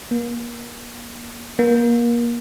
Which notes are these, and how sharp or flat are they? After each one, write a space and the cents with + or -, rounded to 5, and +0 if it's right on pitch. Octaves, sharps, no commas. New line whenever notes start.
A#3 +35
A#3 +30